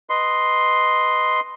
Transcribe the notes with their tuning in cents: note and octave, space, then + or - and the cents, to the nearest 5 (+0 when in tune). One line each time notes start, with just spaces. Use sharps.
B4 +0 D#5 +0 C6 +0